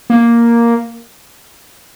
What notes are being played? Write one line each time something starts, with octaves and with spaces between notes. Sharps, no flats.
A#3